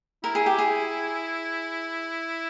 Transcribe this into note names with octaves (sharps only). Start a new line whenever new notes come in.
E4 A#4
G#4
G4
G#4